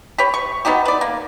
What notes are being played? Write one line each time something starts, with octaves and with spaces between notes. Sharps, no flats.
G4 B4 C#5
C#6
B3 D#4 F#4 G4
B4 D5
A#3